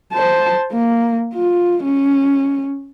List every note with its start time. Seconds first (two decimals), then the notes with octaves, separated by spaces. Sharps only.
0.13 C5 A5
0.73 A#3
1.34 F4
1.83 C#4